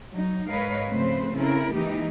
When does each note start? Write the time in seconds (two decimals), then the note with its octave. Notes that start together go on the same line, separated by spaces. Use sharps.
0.12 F#3 D#4
0.49 G#2 A#4 B4 C#5 D#5 F5
0.90 C#3 F3 A3 C4 B4 C5
1.34 C#3 C4 C#4 E4 A4 A#4
1.74 E3 G#3 A#3 D#4 E4 G4